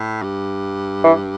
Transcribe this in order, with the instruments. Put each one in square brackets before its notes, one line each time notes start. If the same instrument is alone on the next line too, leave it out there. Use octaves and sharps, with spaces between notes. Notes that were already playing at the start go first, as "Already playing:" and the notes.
Already playing: [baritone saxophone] A2
G2
[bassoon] E3